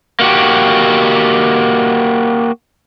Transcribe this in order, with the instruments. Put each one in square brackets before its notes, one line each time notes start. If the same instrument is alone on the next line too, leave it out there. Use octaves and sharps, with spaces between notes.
[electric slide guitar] A#3 F#4 G4